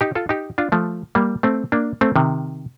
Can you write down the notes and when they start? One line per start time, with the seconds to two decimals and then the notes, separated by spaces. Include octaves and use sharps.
0.01 D#4 G4
0.15 F4 A4
0.29 D#4 G4
0.58 D4 F4
0.72 F3 A3
1.15 G3 A#3
1.43 A3 C4
1.72 A#3 D4
2.01 A3 C4
2.16 C3 D#3